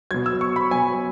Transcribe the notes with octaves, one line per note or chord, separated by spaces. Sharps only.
B2 F#3 G#6
E6
C#6
B5
B2 F#3 G#5